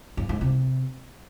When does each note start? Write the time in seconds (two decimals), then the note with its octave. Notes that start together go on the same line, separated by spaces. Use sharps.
0.17 G2
0.29 G#2
0.41 C3